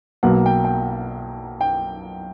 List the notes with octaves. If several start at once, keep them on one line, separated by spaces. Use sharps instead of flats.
B1 B2 F#3 A#3 F#5
G5
G5
G5